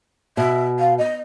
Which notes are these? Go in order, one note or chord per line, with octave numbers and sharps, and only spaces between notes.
B2 E5
F5
D#5